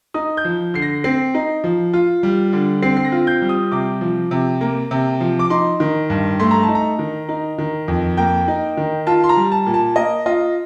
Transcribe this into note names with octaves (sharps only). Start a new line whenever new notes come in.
D#4 D#6
G6
F3
D3 C7
A#6
C4 C7
D#4
F3
F4
G3
D3
C4 C7
C7
A#6
F4
G6
G3
D#6
C3 D6
F3
C3
A#3
C3
F3
D6
D#4 C6
D#3
G2
A3 C6
A#5
A5
D#4
A#5
D#3
D#4
D#3
F2
A#3 G5
D#4
D#3
F4 A5
C6
A#5
G3
A5
A#2
A5
A#3 D#5
F4 D#5